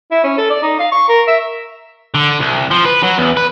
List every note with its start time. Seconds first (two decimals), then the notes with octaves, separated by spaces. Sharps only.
0.11 E4
0.24 C#4
0.38 A4
0.50 D5
0.62 D#4
0.79 F5
0.92 C#6
1.08 A#4
1.28 E5
2.15 D3
2.40 C2
2.71 F3
2.85 B4
3.03 F#3
3.18 E2
3.37 B4